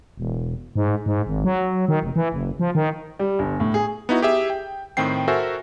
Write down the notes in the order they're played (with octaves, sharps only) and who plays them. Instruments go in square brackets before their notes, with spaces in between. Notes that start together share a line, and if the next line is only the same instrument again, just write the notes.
[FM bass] E1
G#2
G#2
G#1
F#3
D#3
F1
E3
F#1
F3
D#3
[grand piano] G3
G1
A2
G#4
[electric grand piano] B3 D#4 E4 F#4
G4 G#4 E5
G5
A2 D#3 C4 G5 C7
F#4 A4 A#4 C5 E5 G#5